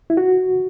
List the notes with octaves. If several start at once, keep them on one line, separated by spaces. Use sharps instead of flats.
E4
F#4